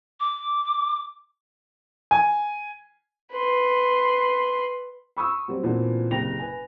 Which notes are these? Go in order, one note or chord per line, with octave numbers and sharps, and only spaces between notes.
D6
G#5
B4 C6
B5 C#6 D#6 E6
F#3 G3 C4
A#2 E3 B3 C4 D4 F#4
F#1 C3 G5 A#6 F7
B4 G#5